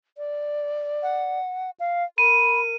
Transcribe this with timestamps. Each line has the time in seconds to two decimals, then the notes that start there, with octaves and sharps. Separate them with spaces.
0.18 D5
1.03 F#5
1.80 F5
2.18 A#4 B5 D#7